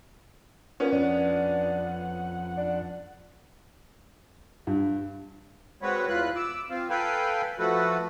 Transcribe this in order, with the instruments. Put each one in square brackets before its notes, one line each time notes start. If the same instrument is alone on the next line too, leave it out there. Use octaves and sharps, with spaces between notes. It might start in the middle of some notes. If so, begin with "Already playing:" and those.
[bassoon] A#2 [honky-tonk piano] B3 C#4
[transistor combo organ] F2 F#5 [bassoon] D4
[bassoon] D4
[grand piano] G2
[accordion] G#3 C4 F#4 B4 C#5
E2 F4 B4 F#6
D6 E6
C4 F4
A4 B4 F5 G5 G#5 B5
F3 A3 F#4 A4 B4